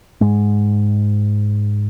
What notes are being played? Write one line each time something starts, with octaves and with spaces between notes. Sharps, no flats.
G#2 G#3